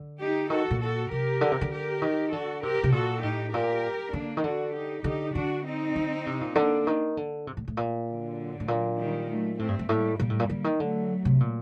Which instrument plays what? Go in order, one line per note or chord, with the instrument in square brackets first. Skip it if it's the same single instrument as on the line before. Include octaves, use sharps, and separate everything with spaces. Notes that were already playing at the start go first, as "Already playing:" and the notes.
Already playing: [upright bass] D3
[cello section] D#4 G4
[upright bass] D#3 [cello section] F#4 A4
[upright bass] A#2
[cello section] F#4 A4
[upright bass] C3 [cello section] G4 A#4
[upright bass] D3
C3
D3
[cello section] G4 A#4
[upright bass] D#3
[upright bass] D3 [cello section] F#4 A4
[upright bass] C3 [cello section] G4 A#4
[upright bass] C3
[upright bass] A#2 [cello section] F#4 A4
[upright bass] A2 [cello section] D#4 G4
[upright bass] A#2 [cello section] G4 A#4
[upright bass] D3 [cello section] A#3 D4
[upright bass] D#3
[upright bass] D3 [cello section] D4 F#4
[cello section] D#4 G4
[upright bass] D3 [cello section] D#4 G4
[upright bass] D3 [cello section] D4 F#4
[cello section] C4 D#4
[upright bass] D3
C3
A#2
[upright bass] D3 [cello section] A#3 D4
[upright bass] D#3
D3
C3
A2
A2
A#2
[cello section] D3 F#3
[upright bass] A2
A#2
[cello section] D#3 G3
F#3 A3
[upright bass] A2 [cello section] A3 C4
[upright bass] G2
G2
[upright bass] A2 [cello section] G3 A#3
[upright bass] A#2 [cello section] G3 A#3
[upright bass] A2
A#2
D3
D#3
[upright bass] D3 [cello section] F#3 A3
[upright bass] C3
A#2